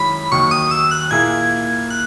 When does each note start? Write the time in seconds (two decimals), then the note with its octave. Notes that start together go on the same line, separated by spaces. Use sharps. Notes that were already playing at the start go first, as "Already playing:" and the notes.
Already playing: F#2 D#3 G#3 C#4 E4 B5
0.32 D#2 D#3 F#3 C#6
0.51 D#6
0.71 E6
0.91 F#6
1.11 A#2 A#3 E4 G#4 G#6
1.90 F#6